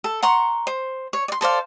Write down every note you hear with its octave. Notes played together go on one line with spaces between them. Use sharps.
A4
F#5 A#5 C6 C#6
C5
C#5
D5 C6
A4 C5 D5 F5